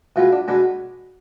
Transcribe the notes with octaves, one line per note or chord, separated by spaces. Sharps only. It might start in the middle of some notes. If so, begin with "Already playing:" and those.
B2 G#3 B3 F4
D4
B2 G#3 B3 D4